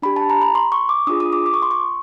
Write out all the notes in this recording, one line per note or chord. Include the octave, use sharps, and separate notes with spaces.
D4 G4 B5
A5
A#5
B5
C6
C#6
D6
D4 F4 G#4 D#6
D#6
D6
D6
C#6
C6
C#6